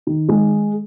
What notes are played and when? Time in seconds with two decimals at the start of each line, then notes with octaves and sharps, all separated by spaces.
0.07 D#3
0.29 G#3